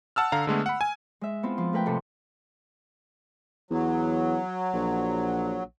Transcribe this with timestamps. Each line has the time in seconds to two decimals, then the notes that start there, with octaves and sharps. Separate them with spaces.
0.16 F#5 A5 E6 F6
0.32 D3 F5 A#5
0.47 D3 G#3 A3 B3
0.66 F#5 B5
0.81 G#5
1.21 G#3 E5
1.43 B3 C4 E4 F4
1.58 F3
1.73 A3 A#4 B4 G5
1.86 G#2 C3 A4 C6
3.71 E2 F#3
4.73 A#1